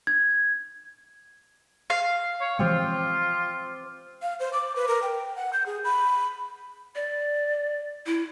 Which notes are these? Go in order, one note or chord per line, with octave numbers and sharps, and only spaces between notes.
G#6
F5
C#5
E3 F3 G#3 C4 F4 G4
F5
C5
D6
B4
A#4
G5
F#5
G6
G#4
B5
D5
E4